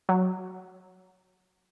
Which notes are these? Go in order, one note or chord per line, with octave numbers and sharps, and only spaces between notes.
F#3